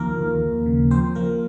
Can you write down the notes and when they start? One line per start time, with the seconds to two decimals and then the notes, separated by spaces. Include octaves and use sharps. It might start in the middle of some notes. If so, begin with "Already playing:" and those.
Already playing: D#2 F3 A#3 A#4
0.17 D#2
0.43 D#2
0.66 C#3
0.91 F3 C4 C5
1.15 F3 A#3 A#4